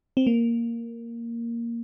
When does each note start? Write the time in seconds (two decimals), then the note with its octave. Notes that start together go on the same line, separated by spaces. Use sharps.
0.17 C4
0.27 A#3